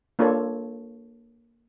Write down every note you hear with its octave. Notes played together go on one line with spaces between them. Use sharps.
A#3 D4 F4 A4 C#5